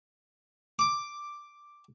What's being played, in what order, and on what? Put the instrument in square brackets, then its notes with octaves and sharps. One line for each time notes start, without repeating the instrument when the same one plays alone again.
[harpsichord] D6